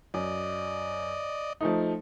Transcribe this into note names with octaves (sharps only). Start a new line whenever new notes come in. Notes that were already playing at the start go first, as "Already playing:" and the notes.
F#2 D5 D#5
F3 A3 D#4